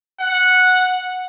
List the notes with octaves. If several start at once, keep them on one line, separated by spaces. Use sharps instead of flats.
F#5